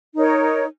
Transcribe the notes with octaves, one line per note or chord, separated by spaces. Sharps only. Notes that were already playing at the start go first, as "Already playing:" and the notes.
D#4 A#4 C#5